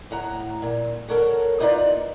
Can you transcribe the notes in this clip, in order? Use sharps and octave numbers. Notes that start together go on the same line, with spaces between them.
A2 F#5 A#5
A#2
A4 A#4 C#5 F#5
A#3 D#4 F4 B4 D5